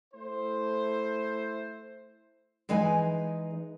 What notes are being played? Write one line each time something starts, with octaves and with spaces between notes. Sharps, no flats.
A3 E4 C5
E3 G#3 D#4 B4 G#5